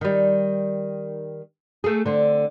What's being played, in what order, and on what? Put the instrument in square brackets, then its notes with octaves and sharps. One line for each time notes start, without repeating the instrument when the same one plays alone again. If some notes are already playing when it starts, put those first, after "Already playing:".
[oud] D#3 G3
A3 G#4
D3 C4